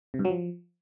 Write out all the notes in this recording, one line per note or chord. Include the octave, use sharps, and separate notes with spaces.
C3
G2
F#3
F3